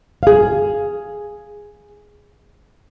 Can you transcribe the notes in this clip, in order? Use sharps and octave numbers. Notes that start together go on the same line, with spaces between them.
G#4 F5